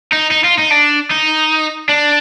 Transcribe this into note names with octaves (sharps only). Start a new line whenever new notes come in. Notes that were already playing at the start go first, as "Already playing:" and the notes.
D#4
D#4
F4
D#4
D4
D#4
D4